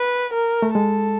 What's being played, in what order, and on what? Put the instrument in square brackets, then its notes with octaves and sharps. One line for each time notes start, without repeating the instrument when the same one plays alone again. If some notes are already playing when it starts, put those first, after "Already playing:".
Already playing: [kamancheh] B4
A#4
[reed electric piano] A3
[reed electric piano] G#3 [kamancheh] A4